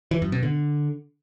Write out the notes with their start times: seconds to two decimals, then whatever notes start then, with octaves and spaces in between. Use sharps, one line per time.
0.11 E3
0.22 F#2
0.32 B2
0.43 D3